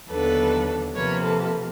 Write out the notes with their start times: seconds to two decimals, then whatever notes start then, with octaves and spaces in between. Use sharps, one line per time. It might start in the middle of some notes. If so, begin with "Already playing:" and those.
0.10 D#2 D3 F#3 B3 D4 A4 B4
0.96 C3 F3 A#3 B4 C#5
1.24 A4 B4